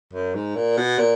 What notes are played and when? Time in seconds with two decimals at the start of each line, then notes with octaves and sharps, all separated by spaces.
0.13 F#2
0.35 G#2
0.56 A#2
0.77 B2
0.98 A#2